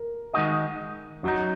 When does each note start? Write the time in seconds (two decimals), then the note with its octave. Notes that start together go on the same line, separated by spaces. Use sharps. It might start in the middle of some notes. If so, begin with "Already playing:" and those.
Already playing: A#4
0.33 D#3 G#3 D#4 F#4 D#5
1.23 F#2 F#3 D#4 F#4